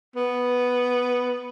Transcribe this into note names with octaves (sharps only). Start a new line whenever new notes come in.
B3